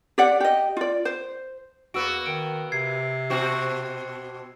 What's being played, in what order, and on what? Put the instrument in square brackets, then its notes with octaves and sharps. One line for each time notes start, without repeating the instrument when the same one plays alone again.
[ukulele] G4 D5 F#5
G4 D#5
F4 D5
C5
[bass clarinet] E2 [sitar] A#3 B3 F#4 [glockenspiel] E6 D7
[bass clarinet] D#3 [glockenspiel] D7
[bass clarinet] C3 [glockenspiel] G#6 C7
[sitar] B2 C4 F#4